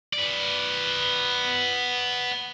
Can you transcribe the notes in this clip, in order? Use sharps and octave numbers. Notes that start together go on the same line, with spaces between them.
B3 D5